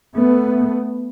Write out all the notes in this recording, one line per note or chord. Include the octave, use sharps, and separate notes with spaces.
A3 B3